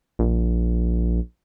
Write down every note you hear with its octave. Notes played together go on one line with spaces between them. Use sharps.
A#1